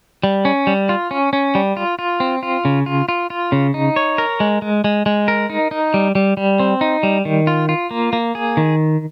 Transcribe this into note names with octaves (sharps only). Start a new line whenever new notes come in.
G3
C#4
G3
F4
C#4
C#4
G3
F4
F4
C4
F4
C#3
F4
F4
F4
C#3
D#4
C#5
A#4
G#3
G#3
G#3
G#3
A#4
D#4
D#4
G3
G3
G3
C4
D#4
G3
D#3
F4
F4
A#3
A#3
G#4
D#3